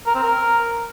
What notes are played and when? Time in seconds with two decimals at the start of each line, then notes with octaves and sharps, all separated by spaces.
0.06 A#4
0.15 C4
0.23 A#4